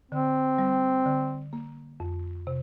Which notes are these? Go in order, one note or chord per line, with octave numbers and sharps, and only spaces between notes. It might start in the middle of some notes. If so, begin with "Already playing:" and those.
D3 C4
G3
D3
A#3
F2
C3